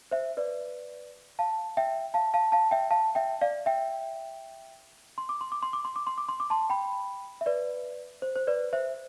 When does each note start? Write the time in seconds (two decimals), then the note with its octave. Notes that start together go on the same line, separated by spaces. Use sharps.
0.11 C5 E5
0.37 B4 D5
1.39 F5 A5
1.77 E5 G5
2.14 F5 A5
2.34 F5 A5
2.52 F5 A5
2.71 E5 G5
2.90 F5 A5
3.15 E5 G5
3.41 D5 F5
3.66 E5 G5
5.18 C6
5.29 D6
5.41 C6
5.52 D6
5.63 C6
5.73 D6
5.85 C6
5.96 D6
6.07 C6
6.18 D6
6.29 C6
6.40 D6
6.50 A5 C6
6.70 G5 B5
7.41 E5
7.46 B4 D5
8.22 C5
8.35 C5
8.47 B4 D5
8.73 C5 E5